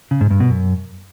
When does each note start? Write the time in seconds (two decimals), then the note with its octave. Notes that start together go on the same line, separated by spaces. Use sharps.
0.11 C#3
0.21 G#2
0.31 G2
0.40 B2
0.50 F#2